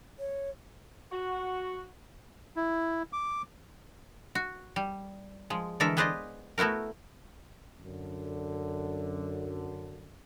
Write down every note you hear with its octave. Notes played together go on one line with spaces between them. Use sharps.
C#5
F#4
E4
D6
F#4
G3
F3 G#3
D3 E3 G#3 A4 A#4 E5
B3 G#4 B4 C5 D5 D#5
A3 B3 E4 F#4 A#4
F#2 D3